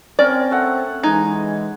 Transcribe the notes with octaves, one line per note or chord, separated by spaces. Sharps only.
C4 C#4 A#4 D5
A3 F#5
E3 G#3 D#4 G#5